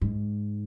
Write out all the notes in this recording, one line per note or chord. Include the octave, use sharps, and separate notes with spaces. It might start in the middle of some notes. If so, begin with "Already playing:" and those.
G#2